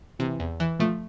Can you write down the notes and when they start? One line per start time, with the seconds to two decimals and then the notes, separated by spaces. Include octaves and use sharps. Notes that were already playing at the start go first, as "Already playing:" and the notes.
0.19 C3 E3
0.40 E2
0.60 E3
0.79 F3 A3